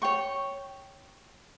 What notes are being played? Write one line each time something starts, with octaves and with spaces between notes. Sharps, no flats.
C#5 G5 C#6